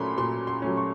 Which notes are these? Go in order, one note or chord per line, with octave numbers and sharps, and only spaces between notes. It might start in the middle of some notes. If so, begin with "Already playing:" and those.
Already playing: A#2 F#3 A3 C#4 B5 C6
A#2 C6
C6
F#3 A3 C#4
C#6